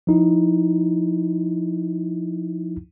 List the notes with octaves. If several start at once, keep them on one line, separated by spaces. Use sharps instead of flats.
F3 D#4 E4